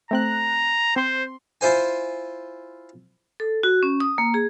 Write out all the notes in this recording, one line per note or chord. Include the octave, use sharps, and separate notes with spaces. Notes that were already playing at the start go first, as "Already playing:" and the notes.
A3 C4 A#5 F#6
C4 C5 C6
E4 F4 C5 G#5
A4
F#4
C#4
D#6
A#3
G#4